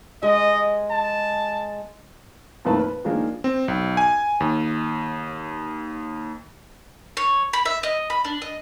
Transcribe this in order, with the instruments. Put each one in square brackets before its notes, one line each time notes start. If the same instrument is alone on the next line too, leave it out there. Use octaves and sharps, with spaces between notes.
[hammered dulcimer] G#3 [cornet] D#5
[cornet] A5
[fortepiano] F2 A#2 D#3 A3 B4 A5
B4
D#3 F3 G#3 A#3 D4
[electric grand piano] C4
B1
G#5
D#2
[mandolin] C#5
B5
E5
D#5
B5
D4
D#5